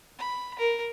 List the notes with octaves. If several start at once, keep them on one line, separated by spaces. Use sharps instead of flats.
B5
A#4